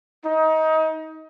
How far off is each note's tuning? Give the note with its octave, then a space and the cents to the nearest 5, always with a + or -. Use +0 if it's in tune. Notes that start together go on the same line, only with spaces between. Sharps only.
D#4 +25